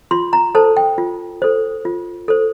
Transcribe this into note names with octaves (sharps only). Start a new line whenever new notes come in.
F4 C6
A#5
A4 C5 A5
G5
F4
A4 C5
F4
A4 C5